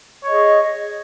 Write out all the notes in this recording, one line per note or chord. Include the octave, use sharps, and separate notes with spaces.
G#4 C#5 D#5